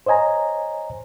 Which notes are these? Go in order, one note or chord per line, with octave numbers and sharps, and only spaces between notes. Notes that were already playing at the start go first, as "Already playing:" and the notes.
C5 C#5 D#5 G#5 A#5